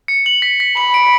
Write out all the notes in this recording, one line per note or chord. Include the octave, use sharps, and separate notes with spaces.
C#7
F#7
B6
B6
B5 F#7
D7